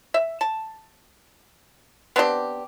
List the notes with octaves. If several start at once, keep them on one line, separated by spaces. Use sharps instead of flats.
E5
A5
B3 C4 D4 G4